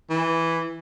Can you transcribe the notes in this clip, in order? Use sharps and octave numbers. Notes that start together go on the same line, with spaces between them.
E3